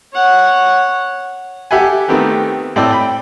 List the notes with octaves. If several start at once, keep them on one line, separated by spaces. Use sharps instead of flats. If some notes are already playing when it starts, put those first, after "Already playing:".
C#5 F#5
G4 A4 E5 F#5 G#5
D#3 A3 B3 C4 G4 A#4
A2 C4 A4 D5 G5 E6
G5 B5